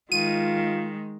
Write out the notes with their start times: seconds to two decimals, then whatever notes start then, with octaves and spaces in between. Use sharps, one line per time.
0.12 D#3 G#3 F4 D#7